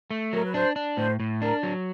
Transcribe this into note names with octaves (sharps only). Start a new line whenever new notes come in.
A3
F#3 A#4
B4
D4 C5
D4
A2 C5
A2
D4 A#4
F#3